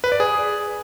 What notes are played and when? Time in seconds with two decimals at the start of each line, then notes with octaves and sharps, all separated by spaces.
0.04 B4
0.12 D5
0.20 G#4